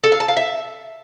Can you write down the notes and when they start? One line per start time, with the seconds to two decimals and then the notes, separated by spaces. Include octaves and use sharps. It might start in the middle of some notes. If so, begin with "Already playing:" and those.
0.04 A4
0.12 F5
0.20 A5
0.28 F5
0.37 E5